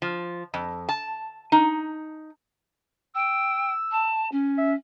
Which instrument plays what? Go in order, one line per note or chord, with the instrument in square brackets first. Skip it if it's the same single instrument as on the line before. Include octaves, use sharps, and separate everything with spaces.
[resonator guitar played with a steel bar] F3
F2
A5
D#4
[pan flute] G5 [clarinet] E6
[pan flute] A5
C#4
[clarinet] E5